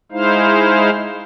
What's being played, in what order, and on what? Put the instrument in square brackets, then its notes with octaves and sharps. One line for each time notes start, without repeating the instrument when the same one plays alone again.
[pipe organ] G#3 D#4 E4 C5 F5